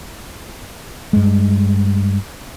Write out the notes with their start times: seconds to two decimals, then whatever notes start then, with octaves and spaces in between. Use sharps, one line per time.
1.13 G2 G#3